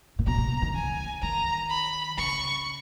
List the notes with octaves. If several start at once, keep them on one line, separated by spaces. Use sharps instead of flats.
A#2
B2 A#5
B2
C#3
D#3
E3 G#5
D#3 A#5
B5
C#3 C#6